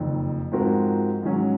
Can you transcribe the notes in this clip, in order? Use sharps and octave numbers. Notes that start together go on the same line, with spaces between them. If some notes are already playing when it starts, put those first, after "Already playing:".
Already playing: F#1 F2 D#3
G#2 F3 C4 F#4 A#4
G#2 D#3 F#3 C#4